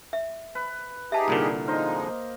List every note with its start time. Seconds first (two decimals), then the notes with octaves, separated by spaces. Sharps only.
0.13 E5
0.55 B4
1.12 D#4 G4 G#4 E5 A5
1.28 C2 A#2 D3 A#3
1.67 F3 G#3 D#4 A#4 C5 D#5